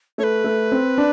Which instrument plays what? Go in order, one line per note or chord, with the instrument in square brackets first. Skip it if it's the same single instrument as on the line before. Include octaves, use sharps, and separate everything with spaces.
[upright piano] A3 [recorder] C#5
[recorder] B4
[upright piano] A3
C4
D4